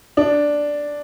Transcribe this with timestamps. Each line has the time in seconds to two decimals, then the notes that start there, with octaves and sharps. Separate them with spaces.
0.17 D4